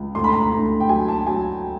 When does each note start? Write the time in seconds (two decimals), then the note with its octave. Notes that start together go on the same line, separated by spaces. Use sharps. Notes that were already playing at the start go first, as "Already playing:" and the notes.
Already playing: C#2
0.15 D2 C6
0.24 B5
0.33 A#5
0.42 B5
0.52 D2
0.80 G5
0.89 F#3 G#5
1.08 A5
1.27 F#3 G#5